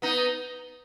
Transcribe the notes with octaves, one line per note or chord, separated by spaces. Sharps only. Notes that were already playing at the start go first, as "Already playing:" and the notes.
B3 D#4